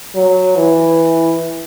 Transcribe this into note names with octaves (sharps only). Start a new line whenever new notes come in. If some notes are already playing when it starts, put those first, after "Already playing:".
F#3
E3